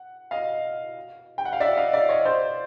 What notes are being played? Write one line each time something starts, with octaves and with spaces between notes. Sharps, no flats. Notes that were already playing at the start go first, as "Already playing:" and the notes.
Already playing: F#5
D#5 F5
G5
F#5
F5
D5 E5
D#5 F5
D5 E5
C#5 D#5
C5 D5